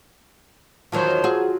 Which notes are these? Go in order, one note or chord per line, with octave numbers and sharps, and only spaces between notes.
E2 D#3 F3 F#3 C5
F#3 F4 G#4